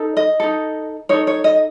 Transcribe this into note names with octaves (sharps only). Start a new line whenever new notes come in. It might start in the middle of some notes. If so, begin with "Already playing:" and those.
Already playing: D#4 A4
D#5
D#4 A4
D#4 A4 C#5
C#5
D#5